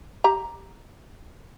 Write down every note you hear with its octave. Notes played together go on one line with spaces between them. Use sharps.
G4 A#5